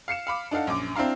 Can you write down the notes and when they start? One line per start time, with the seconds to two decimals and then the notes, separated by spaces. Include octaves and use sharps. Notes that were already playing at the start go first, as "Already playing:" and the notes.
0.08 F5 C7 C#7 E7
0.27 F5 B5 D6
0.51 D4 D#4 A4 F5 F#5
0.67 A#1 F#2 D6
0.96 C4 D4 E4 F5 A#5